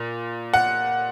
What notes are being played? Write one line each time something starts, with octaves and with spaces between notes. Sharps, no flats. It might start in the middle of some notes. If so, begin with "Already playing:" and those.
Already playing: A#2
F#5